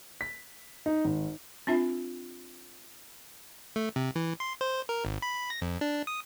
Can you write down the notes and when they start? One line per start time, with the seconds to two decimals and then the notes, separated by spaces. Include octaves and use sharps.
0.21 B6
0.86 D#4
1.05 G#1
1.67 C4 D4 F4 E5
3.76 A3
3.96 C3
4.16 E3
4.40 C6
4.61 C5
4.89 A#4
5.05 G#1
5.22 B5
5.50 A#6
5.62 F2
5.81 D4
6.07 D#6